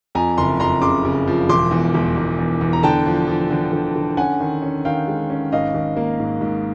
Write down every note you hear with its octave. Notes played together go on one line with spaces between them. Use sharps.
F2 G#5 A#5
F#1 A#5 C6
F2 A#5 C6
C#3 C6 D6
C#3
F3
E1 C6 D6
E2
E1
E1
E2
E2
A#5
D3 G5 A5
F3
F3
D3
D3
D3
C#4 F#5 G#5
D#3
C#4
D#3 F5 G5
G#3
C#4
G#1 D#5 F5
G#1
A#3
G#2
G#2